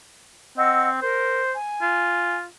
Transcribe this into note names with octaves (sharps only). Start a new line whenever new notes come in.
C4 D#5 F#5 E6
A#4 C5
G#5
F4